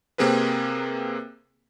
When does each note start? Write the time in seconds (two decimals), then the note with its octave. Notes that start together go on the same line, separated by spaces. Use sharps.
0.18 C3 A#3 C4 G#4 A#4 B4